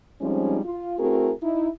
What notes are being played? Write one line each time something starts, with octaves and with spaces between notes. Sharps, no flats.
F3 G3 G#3 C4 C#4 D#4
F4
A3 C4 E4 F#4 G#4 A#4
D#4 E4